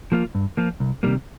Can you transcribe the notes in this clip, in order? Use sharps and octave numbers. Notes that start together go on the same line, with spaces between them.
F3 A#3 F4
G2
F3 A#3 F4
C2
C3 D#3 G3 A#3